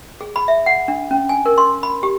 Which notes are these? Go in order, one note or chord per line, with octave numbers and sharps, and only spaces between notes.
G#4
B5
E5
F#5
D4
C#4
G#5
A#4
C6
B5
G4